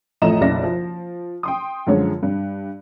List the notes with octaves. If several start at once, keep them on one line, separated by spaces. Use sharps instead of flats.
A1 F2 A3 D#5 A#5 E7
F#1 B1 C#3 D5 E5 A#6
F3
G5 C6 D#6
F#2 D3 F3 G#3 F4 C#5
G2